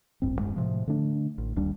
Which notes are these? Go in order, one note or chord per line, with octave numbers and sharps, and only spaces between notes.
D1 A1 G2 C4
E1 G2 G#3
A2 C3 F3
D3 A3 D4
A1
D1 D#2 G3 D4